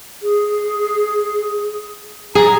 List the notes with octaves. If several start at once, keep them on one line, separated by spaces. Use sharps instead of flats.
G#4
G#4 A#5